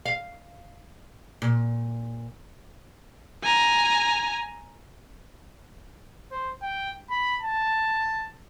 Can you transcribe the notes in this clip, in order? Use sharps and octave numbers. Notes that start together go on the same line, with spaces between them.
F5
A#2
G#5 A#5
C5
G5
B5
A5